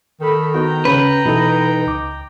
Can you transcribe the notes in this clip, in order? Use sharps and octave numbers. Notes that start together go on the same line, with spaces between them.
D#3 A4 B5
B3 D#4 F#4 G5 A#5
C#3 C#4 B4
B2 E3 D#4 A4
C#2 D6